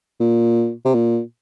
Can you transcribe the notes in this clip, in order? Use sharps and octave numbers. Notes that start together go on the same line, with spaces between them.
A#2
C3
A#2